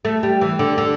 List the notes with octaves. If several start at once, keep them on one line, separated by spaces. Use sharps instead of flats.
A3
G3
E3
D3
D3